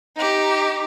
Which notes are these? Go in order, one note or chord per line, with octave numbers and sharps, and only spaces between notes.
D#4 G4